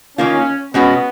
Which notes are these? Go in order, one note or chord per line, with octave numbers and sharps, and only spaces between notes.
D#3 A#3 C#4 F4
B2 G#3 B3 C#4 F#4